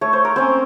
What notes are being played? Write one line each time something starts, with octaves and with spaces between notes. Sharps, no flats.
A3 C#5
C5
A#4
C4 C#4 C5